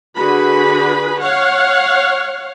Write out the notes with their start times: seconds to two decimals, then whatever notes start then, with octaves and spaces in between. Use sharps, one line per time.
0.17 D3 F#4 G#4 B4 B5
1.21 C#5 F5 F#5